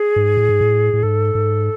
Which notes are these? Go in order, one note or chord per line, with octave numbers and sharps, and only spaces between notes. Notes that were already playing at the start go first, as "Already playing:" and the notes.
Already playing: G#4
G#2
A2
G#2
A2
A2
G#2 A4
G#2